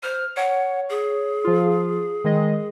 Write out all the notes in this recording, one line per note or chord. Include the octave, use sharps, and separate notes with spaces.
C5 F6
C#5 F#5
G#4
F3 F4
D#3 G#3 D#5